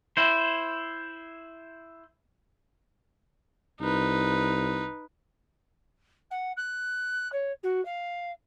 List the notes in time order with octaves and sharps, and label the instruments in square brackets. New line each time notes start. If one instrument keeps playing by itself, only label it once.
[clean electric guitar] E4 C5
[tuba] C2 [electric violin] D#4 B4
[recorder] F#5
F#6
C#5
F#4
F5